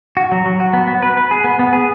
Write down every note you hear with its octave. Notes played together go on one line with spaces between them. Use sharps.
F#4
F#3
F#3
F#4
B3
B3
B4
B4
G#4
B3
B3
G#4